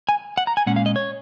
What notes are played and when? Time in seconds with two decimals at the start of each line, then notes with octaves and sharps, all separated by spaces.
0.09 G#5
0.37 F#5
0.47 A#5
0.57 G#5
0.66 A#2 G#3 C#4 F#5
0.76 F5
0.86 D#5
0.96 C#5